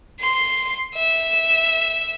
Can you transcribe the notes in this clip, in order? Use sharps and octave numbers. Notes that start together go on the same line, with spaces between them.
C6
E5